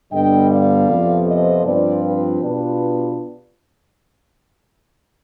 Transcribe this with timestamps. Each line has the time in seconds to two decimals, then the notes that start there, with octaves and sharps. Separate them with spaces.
0.12 G2 D3 G3 B3 D#5 G5
0.50 D5 F5
0.89 F2 C3 F3 B3
1.27 C5 D#5
1.65 G2 F3 C4 F4 B4 D5
2.03 G4 B4
2.43 B2 B3 D4 F4 G4 B4